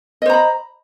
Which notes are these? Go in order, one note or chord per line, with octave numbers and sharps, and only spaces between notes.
C5 D#5 A#5 B5